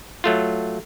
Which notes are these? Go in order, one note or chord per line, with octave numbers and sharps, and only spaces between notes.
F#3 A3 F4